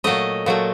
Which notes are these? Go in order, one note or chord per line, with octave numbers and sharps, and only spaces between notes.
A#2 F#3 A3 D#5
A#2 F#3 A3